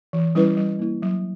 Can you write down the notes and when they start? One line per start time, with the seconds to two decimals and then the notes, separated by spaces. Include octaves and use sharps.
0.13 E3
0.35 G3 C#4 E4 B4
0.57 G3
0.79 A#3 E4
1.02 F#3